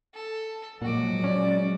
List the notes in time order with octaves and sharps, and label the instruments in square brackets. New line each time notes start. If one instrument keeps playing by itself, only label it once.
[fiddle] A4
[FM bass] A#2 [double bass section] F3 F#3 G#3 [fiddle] F#4 D6
[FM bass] C#4 [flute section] D5